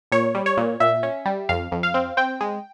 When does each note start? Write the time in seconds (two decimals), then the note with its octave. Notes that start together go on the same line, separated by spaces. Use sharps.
0.12 A#2 C#5
0.35 G3
0.46 C#5
0.57 A#2
0.80 A#2 E5
1.03 C#4
1.25 G3
1.49 F2 F5
1.72 F2
1.83 F5
1.94 C4
2.17 C4 G5
2.41 G#3